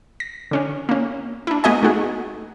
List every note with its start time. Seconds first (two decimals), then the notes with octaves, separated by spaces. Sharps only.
0.20 A#6
0.51 D3 C#4 D4
0.89 A#3 C#4
1.47 D4 E4
1.64 A3 B3 F#4 D#5 G#5
1.83 A3 D#4 F#4 G#4